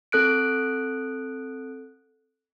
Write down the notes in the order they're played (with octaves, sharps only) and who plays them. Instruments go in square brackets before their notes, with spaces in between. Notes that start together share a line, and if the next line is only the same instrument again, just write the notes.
[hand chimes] C4 A4 F#6 D7